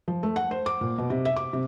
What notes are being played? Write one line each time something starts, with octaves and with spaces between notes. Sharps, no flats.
F3
A3
F#5
C5
D6
A#2
B2
C3
E5
D6
C3